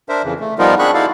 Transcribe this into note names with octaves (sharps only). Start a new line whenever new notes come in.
D4 A#4 C5 E5
F2 C#3 E3
A3
F3 G3 B3 D#4 F4 A#4
C4 D4 G#4 B5 C#6 F#6
D#4 E4 F#4 A4 D5 F5